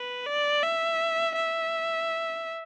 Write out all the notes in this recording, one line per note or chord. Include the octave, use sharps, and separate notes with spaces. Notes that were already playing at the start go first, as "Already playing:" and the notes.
Already playing: B4
D5
E5
E5